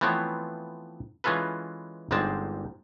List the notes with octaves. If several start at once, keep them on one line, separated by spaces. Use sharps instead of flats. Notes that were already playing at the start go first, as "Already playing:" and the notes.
E3 F3 A3 B3 C4 C#5
E3 G#3 C#4 F4 A4 B4
G1 G#2 D3 G#3 C4 A5